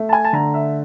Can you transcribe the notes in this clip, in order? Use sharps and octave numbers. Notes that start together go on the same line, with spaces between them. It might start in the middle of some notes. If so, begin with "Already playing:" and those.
Already playing: A3
A5
G#5
A5
D3 A#5
E5